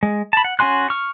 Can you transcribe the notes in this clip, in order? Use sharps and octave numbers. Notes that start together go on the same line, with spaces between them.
G#3
A5 B5
F#5
C#4 F#4 G#5 C6 F#6
C#6 F6